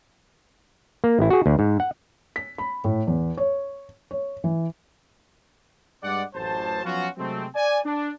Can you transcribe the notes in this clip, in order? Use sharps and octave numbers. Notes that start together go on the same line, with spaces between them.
A#3
A1 E4
F#4 G#4
D2
G#2
F#5
B6
B5
A2
E2
C#5
C#5
E3
G2 G#3 D5 F#5
A1 F#2 C5 A5
F3 F#3 B3 C#4 F4 F#4
C3 F#3 G#3 A3 C4
D5 G#5
D4